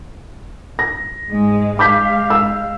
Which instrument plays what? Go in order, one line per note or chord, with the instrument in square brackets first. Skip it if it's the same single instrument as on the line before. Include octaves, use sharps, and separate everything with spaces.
[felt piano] A#6
[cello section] G#2 G#3
[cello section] G#3 F5 [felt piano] D6 G6 B6
[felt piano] E6